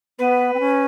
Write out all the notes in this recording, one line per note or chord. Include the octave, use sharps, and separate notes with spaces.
B3 B4
C4
C#4